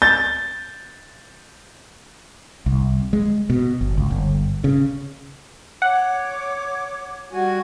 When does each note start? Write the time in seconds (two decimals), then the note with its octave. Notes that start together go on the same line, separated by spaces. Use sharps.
0.02 G6 A6
2.66 C2
3.13 G#3
3.50 B2
3.81 G1
3.98 C#2
4.10 G1
4.64 C#3
5.82 C#5 F#5 D6
7.33 G3 F#4 G#5